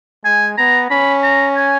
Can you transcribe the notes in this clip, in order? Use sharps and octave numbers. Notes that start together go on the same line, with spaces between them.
G#3 G#5
B3 A#5
C#4 B5
A#5
G#5